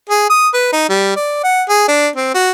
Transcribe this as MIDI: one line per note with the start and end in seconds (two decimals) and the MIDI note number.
0.10 0.28 68
0.30 0.48 87
0.54 0.72 71
0.73 0.85 63
0.89 1.13 55
1.16 1.43 74
1.44 1.63 78
1.69 1.83 68
1.88 2.08 62
2.16 2.29 60
2.34 2.51 66